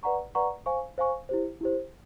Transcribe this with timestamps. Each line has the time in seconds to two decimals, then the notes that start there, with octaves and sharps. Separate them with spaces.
0.03 B4 D5 F#5 A#5 C#6
0.35 B4 D5 F#5 A#5 C#6
0.66 C5 F5 G#5 C#6
0.98 C5 F5 G#5 C#6
1.29 E4 G4 C5
1.61 E4 G4 C5